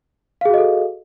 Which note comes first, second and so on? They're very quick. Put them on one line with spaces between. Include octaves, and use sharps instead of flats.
F5 G#4 F#4 D#5 A4